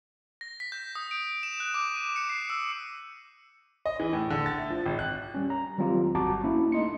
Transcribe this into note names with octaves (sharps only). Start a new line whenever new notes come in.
A#6
B6
G6
D#6
D7
E7
F#6
D6
D#7
C#7
C7
E6
D#5
E3
A2
D3
A6
E5
F3
G#1
F#6
G3 C#4
A#5
D#3 F#3 G3 C4 F4 G4
G1 F#4 A5 A#5 D6
A#3 C#4 D4 E4
A3 D#4 D#5 C6 C#7